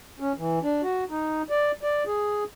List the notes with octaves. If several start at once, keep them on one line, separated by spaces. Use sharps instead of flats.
C#4
E3
D4
F#4
D#4
D5
D5
G#4